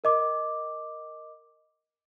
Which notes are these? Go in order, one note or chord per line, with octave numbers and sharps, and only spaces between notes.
A#4 D#5 D6